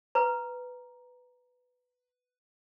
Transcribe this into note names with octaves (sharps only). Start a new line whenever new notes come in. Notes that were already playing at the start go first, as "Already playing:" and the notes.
B4 A#5